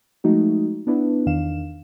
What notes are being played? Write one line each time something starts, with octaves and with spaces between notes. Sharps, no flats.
F3 G#3 A3 D#4 F#4
B3 D4 E4 B4
E2 D#3 D4 F5 E7